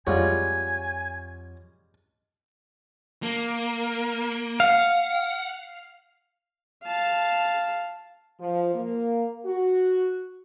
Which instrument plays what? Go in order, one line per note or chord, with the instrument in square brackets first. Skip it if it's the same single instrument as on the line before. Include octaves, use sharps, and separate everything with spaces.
[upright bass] F2 [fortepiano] G3 G#3 F4 [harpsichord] C#5 F#5 [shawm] G#5
[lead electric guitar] A#3
[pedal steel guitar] F5 [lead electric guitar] F#5
[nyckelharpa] F5 A5
[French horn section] F3
A#3
F#4